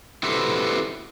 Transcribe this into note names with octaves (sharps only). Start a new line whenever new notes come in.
E4 F#4 G4 A4 B4 C5